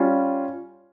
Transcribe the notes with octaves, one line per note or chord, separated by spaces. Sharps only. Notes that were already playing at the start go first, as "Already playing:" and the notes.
Already playing: G3 C#4 F4